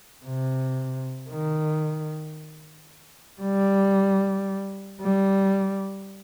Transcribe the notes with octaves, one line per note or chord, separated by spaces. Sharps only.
C3
D#3
G3
G3